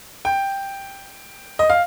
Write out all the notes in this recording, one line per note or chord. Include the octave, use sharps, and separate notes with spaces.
G5
D#5
F5